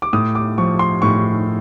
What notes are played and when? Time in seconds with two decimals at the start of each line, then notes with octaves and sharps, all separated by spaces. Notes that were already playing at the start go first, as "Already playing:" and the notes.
0.02 D6
0.13 A2 D#6
0.35 D6
0.58 F3 C#6
0.79 C6
1.02 A2 C#6